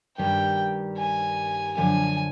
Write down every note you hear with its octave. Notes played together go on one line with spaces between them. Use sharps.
G2 D#3 G3 G5
G#5
F#2 D3 F3 G#5